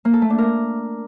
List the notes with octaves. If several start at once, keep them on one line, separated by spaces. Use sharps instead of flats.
A#3
A4
A3
D4
A#4